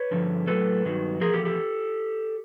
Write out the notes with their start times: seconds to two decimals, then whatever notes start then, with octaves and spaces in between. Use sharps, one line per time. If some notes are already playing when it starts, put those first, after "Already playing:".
Already playing: B4 C#5
0.11 G2 D3 F3
0.47 A2 F#3 A4 B4
0.85 G2 D#3 F#3
1.21 E2 C3 F3 G#4 A#4
1.33 G4 A4
1.45 G4 A4